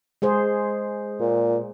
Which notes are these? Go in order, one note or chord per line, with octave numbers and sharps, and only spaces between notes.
G#3 G#4 C5
A#2